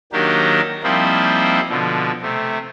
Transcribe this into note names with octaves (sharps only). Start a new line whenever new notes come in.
D#3 F#3 A#3 D4 G4 A#4
F3 G3 A#3 C4 D#4 E4
B2 D3 F3
C3 A3